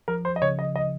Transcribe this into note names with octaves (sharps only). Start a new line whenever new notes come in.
F3 A#4
C5
D#5
C#3 C#5
D#5
D#5